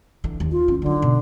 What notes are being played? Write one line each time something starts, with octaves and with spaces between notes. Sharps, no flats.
D3 E3
D#2
F4
F3 C#4
D3 F#3 D#4
B2